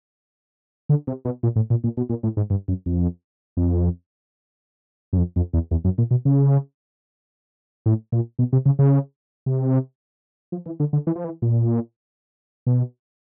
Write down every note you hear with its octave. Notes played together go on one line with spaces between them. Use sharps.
D3
C3
B2
A#2
A2
A#2
A#2
B2
A#2
A2
G#2
G2
F#2
F2
F2
F#2
F2
F2
E2
E2
F#2
A#2
B2
C#3
A2
A#2
B2
C3
C#3
C#3
C3
F3
E3
D3
D3
E3
F3
E3
A#2
B2